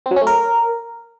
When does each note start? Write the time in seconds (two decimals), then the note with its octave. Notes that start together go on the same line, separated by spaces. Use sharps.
0.06 C4
0.11 F#3
0.16 C#4
0.21 A3
0.27 A#4